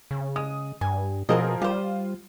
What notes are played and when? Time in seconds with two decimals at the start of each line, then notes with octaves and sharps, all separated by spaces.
0.11 C#3
0.36 G#3 D#6
0.81 G2 G#5
1.29 B2 F3 F#3 C4 G#4 A#4 D#5
1.62 G3 F4 G4 C5